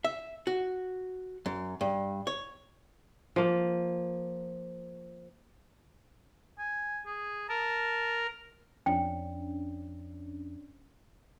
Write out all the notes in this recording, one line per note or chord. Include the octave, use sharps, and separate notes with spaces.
E5
F#4
F#2
G2
C#5
F3 A#3
G#5
G#4
A#4 A5
F2 C#4 D4 G5